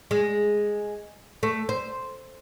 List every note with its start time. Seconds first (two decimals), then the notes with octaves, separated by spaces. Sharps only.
0.11 G#3
1.43 A3
1.69 C5